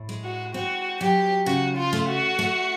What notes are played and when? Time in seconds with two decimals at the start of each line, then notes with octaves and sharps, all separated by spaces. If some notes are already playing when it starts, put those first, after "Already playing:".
Already playing: A2
0.09 G#3
0.24 F#4
0.54 C4 F#4
1.00 F#3 G4
1.46 C#3 F#4
1.77 F4
1.93 A3
2.09 F#4
2.39 A3